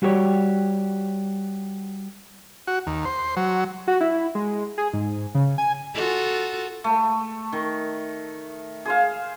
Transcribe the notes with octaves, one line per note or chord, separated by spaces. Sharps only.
G3 F#4 G4 A4 C#5 D5
F#4
D#2
C5
F#3
F#4
E4
G#3
G#4
G#2
C#3
G#5
F4 F#4 A4
A3
D#3
G#4 C5 F5